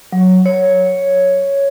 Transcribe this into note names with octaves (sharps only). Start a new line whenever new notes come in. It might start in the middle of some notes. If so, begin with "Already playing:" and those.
F#3
C#5